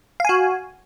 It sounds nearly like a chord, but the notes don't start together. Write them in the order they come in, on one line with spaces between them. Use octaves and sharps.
F5 G#5 F#4